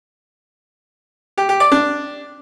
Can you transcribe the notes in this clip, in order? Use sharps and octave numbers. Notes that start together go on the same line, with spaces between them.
G4
G4
D5
D4